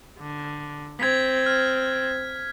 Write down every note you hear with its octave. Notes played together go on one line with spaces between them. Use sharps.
D3
C4 G#6 B6
F6